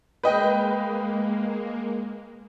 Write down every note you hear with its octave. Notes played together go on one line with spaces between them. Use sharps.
G#3 A#3 B4 D#5 G5